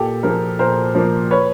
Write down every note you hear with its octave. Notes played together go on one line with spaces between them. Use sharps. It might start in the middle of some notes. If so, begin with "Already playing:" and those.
Already playing: A#2 G4 A4
F3 A#3 G#4 A#4
A#2 A#4 C5
F3 A#3
B4 C#5